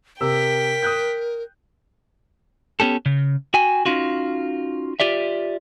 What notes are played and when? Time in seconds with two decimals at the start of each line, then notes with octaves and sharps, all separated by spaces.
0.21 C3 A#4 G5 E6 B6
0.83 D#6 F#6 G6
2.80 B3 C#4 G4 A4
3.06 C#3
3.54 F#4 G5 G#5
3.86 C#4 D#4 F4 F#4
5.00 F4 G4 D5 E5